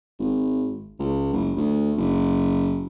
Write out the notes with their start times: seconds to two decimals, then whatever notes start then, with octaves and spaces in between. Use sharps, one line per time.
0.19 G#1
0.99 C#2
1.33 F#1
1.56 D2
1.97 F#1